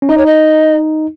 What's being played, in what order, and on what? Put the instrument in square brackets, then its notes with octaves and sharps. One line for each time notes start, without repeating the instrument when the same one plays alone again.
[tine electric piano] C#4
[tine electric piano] D#4 [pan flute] D#5
[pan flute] C#5
D#5